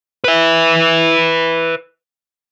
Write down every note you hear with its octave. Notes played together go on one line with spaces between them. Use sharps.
B4 E5